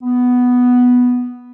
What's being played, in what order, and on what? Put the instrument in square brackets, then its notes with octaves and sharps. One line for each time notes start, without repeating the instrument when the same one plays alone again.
[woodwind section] B3